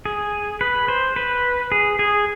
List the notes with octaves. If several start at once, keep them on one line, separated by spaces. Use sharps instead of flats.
G#4
B4
C5
B4
G#4
G#4